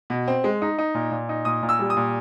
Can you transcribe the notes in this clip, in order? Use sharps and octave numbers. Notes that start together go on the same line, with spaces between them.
B2
C4
G#3
D#4
D#4
A#2
A#2
D#4
A#2 D#6
A#2
E6
G3
D#6
A#2